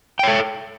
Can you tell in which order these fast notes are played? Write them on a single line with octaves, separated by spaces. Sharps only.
G5 C#5 A4